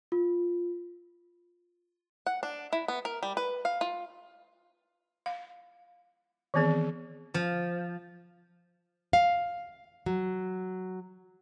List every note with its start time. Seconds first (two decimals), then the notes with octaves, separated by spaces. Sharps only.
0.12 F4
2.27 F#5
2.43 D4
2.73 E4
2.88 B3
3.05 A#4
3.23 G3
3.37 B4
3.65 F5
3.81 F4
5.26 F5
6.54 D#3 E3 B3 C4 G#4
7.34 F3
9.13 F5
10.06 F#3